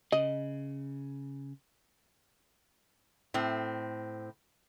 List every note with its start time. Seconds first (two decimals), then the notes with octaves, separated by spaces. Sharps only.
0.12 C#3 D#5
3.34 A2 C4